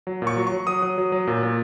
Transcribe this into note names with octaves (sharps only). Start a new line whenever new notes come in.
F#3
A#2
C#6
F#3
C#6
F#3
F#3 D#6
F#3
F#3
F#3
A#2
A#2